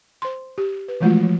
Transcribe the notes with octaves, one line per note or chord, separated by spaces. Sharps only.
C5 C6
G4
B4
E3 F3 G#3 A3 F4 F#4
F3